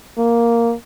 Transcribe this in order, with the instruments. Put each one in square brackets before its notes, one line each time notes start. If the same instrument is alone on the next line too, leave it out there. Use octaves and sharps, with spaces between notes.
[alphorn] A#3